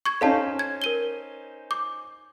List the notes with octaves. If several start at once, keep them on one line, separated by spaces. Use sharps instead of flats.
C#6 G#6
C#4 D#4 A4 C5 F5 A5
G#6
A#4 D#7 G7
D6